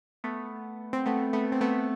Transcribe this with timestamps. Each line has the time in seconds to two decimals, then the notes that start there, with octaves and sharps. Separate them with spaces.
0.24 A3 B3
0.93 C4
1.06 A3 B3
1.33 A3 B3
1.52 C4
1.61 A3 B3